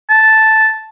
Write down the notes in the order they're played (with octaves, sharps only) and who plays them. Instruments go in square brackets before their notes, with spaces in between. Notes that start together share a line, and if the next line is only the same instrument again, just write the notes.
[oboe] A5